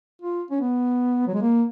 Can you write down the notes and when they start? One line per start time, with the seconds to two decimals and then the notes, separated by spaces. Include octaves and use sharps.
0.22 F4
0.51 C#4
0.61 B3
1.27 F#3
1.34 G#3
1.42 A#3